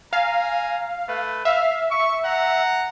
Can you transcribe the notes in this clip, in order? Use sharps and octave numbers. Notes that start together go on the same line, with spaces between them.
F5 G#5 A#5
A3 B4
E5 F5
C#6
F#5 A#5